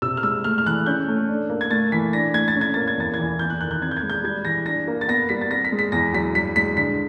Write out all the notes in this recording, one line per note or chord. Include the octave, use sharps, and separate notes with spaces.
C3 E6
F6
G#3 E6
A3 F6
F6
E3 F#6
C#4 G6
A3
D4
A#3
G#6
A3 A6
E3 B6
D4 A#6
A3 G#6
A6
C#4
G#6
A#3 A6
G#6
E2 A6
G#6
E3
E2 G6
F#6
D#3 F#6
G6
C4 G#6
G6
G#6
G#3
G6
G3 G#6
E3 A#6
D4 A#6
A#3
A6
B3 A#6
G3 B6
A6
C4 A#6
B6
G#3
B6
E2 A#6
F#3 B6
G2 B6
G#3 B6
D3 B6